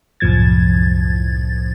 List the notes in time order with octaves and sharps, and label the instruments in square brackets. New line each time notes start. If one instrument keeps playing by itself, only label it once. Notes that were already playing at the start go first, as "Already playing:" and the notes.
[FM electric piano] C2 F#2 A2 F3 G#6 A6